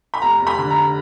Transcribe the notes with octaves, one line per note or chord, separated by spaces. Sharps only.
B5
F1 A#5
F1
B5
D3
A#5